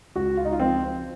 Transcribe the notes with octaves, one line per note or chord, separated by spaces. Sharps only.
C#2 F#4
F4
D#4
F4
F3 C4